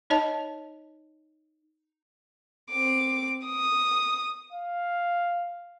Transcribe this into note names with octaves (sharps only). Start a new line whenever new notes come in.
D#4 C#5 D#5 A5
C4 D6
D#6
F5